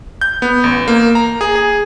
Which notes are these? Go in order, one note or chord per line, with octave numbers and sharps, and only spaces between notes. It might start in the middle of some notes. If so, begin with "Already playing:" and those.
G6
B3
A1
A#3
A#5
G#4
G#4